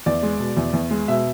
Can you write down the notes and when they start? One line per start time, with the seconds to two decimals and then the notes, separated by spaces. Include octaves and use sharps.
0.06 E2 D5
0.23 G#3
0.39 B2
0.57 E2
0.73 E2
0.91 G#3
1.08 B2 E5